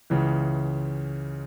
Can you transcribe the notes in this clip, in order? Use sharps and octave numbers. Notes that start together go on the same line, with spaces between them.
C#2 C#3 E3